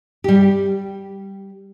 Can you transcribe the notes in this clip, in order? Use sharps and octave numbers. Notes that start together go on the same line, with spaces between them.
G3 G4